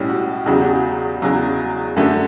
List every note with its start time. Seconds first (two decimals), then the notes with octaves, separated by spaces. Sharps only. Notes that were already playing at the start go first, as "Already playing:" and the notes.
Already playing: B1 A2 G3 C#4
0.09 F#4
0.46 E2 C#3 F#3 F#4
0.55 G4
0.63 F#4
1.22 E2 C#3 F#3
1.96 F#2 D3 A3 F#4